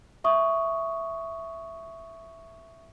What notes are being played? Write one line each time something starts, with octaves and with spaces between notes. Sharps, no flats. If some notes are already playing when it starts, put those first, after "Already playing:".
E5 C#6 D#6